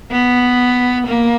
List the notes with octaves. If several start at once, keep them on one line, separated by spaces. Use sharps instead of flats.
B3
A#3